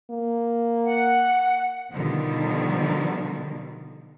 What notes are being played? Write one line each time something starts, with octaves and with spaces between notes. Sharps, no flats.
A#3
F#5
B2 D3 D#3 F3 G3